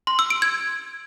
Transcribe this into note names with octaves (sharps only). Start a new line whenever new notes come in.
C6
E6
D7
G#6